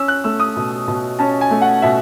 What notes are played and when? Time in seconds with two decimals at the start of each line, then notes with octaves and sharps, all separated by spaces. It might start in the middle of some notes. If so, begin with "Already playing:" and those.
Already playing: C#4 E6
0.08 F#6
0.24 A3 E6
0.40 D#6
0.57 B2
0.88 B2
1.19 C#4 A5
1.41 G#5
1.51 A3
1.62 F#5
1.82 B2 E5